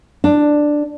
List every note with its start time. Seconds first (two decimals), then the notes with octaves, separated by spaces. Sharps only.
0.24 D4